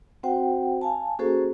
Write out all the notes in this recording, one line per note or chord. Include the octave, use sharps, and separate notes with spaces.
C4 F#4 C5 F#5 G5
F5 G#5 A5
A#3 C#4 F#4 G#4 A4 C5